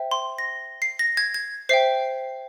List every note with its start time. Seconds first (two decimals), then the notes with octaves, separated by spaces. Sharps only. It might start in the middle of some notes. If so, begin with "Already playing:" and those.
Already playing: C5 E5 G5
0.11 C6
0.38 A#6
0.82 C7
0.99 A#6
1.17 G#6
1.34 G#6
1.69 C5 E5 G5 C7